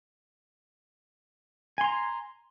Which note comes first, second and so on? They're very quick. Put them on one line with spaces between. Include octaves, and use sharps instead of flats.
G#5 C6 A#5